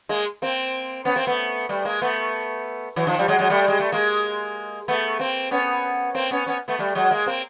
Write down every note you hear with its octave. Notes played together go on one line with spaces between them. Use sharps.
G#3 A#3
A#3 C4
B3 C#4
A#3 C4
A3 B3
G3 A3
G#3 A#3
A3 B3
E3 F#3
D#3 F3
F3 G3
F#3 G#3
F#3 G#3
G3 A3
G#3
A3
G#3 A#3
A3 B3
A#3 C4
B3 C#4
A#3 C4
B3 C#4
B3 C#4
A3 B3
G3 A3
F#3 G#3
G#3 A#3
A#3 C4